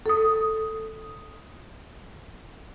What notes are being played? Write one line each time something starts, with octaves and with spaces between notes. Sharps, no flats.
A4 D#6